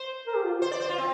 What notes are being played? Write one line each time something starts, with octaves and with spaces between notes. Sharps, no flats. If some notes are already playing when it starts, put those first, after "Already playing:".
Already playing: C5
A#4
G4
F4
C5
D5
C5
F4
C4